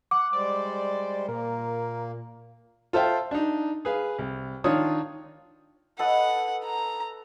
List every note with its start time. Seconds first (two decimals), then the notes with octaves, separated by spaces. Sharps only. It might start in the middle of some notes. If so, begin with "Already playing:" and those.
0.11 F#5 D6
0.33 G3 G#3 C5 D5
1.28 A#2 A#3 A#4
2.93 F4 A4 C5 E5 G5
3.31 D4 D#4
3.85 G#4 B4 F5
4.19 C2
4.64 D#3 D4 D#4 F4 C#5 D#6
5.99 A4 B4 D#5 F#5
6.66 A#5